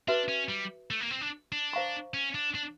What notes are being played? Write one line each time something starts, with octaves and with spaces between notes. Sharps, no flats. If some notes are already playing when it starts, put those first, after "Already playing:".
D4 F#4 B4 E5
C#4
G3
A3
A#3
C4
D4
D4
C5 F5 A#5 C#6
C#4
D4
D4